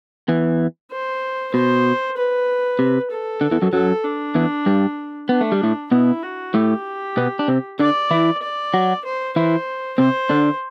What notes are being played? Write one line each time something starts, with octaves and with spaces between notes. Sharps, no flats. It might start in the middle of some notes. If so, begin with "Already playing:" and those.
E2 E3
C5
B2 C5
B4
C3
A4
D3
E2 E3
F#2 F#3
F#2 F#3 A4
D4
E2 E3
G2 G3
B3 D4
A3
G3
A2 A3
B2 B3 E4
F#4
A2 A3 G4
B2 B3
D4
C3 C4
D3 D4 D5
E3 E4
D5
F#3 F#4
C5
E3 E4 C5
C3 C4 C5
D3 D4